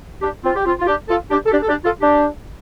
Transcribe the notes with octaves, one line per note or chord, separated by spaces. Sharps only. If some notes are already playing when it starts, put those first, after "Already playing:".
D4 G4
C4 F4
G4
C4 F4
F4
D4 G4
F4 A4
D4 G4
A4
D4 G4
A4
D4 G4
F4 A4
D4 G4